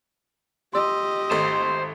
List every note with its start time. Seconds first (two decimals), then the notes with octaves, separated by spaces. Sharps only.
0.74 G4 D#5 C6 E6
1.31 G#1 A3 C5